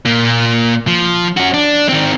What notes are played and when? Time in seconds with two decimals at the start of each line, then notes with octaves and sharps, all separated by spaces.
0.06 A#2 A#3
0.87 F3
1.37 C#4 F#4
1.54 D4
1.89 D#3 C4